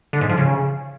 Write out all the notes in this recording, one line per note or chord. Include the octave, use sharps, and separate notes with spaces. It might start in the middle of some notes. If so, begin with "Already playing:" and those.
D3
G#2
F3
C#3